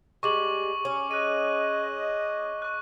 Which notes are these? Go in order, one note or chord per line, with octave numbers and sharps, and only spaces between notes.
G3 G#3 C#6 D6 F#7
C#4
G#4 D#5 F#6 D#7
C#6 F#6